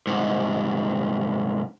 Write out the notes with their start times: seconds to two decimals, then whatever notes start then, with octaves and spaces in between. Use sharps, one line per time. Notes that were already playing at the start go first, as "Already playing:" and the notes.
0.07 C2 G#2